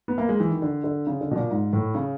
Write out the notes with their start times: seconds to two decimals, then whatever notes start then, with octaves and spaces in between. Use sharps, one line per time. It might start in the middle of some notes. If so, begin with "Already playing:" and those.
0.08 B3
0.18 A#3
0.29 G#3
0.40 E3
0.51 D#3
0.62 D3
0.84 D3
1.07 C#3
1.21 D3
1.31 B2
1.36 A#2
1.51 G#2
1.73 A2
1.95 C#3